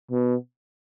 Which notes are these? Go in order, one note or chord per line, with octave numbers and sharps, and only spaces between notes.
B2